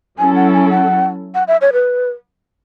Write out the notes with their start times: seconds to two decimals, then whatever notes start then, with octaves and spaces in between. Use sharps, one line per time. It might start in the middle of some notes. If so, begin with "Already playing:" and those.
0.19 F#3 C#4 E4 A4 G#5
0.36 F#5
0.54 G#5
0.70 F#5
1.35 F#5
1.48 E5
1.61 C#5
1.73 B4